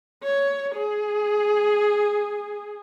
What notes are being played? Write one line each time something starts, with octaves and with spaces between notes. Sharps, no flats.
C#5
G#4